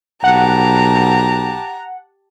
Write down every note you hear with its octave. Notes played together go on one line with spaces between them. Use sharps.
B1 G4 F#5 A5 A#5